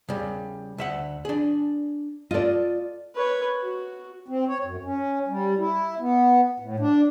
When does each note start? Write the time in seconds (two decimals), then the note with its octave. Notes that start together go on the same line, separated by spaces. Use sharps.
0.09 C#3 G3
0.78 D2 E5 F#5
1.25 D4 G#4
2.31 F4 A4 D5 D#5
3.15 B4 C#5
3.61 F#4
4.28 C4
4.48 C#5
4.64 F#2
4.84 C#4
5.28 G3
5.58 E4
6.00 B3
6.60 A2
6.79 D4